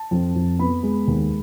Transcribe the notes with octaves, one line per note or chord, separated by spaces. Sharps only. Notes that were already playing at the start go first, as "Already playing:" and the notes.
Already playing: A5
F2
F2
B3 B5
G#3
D#2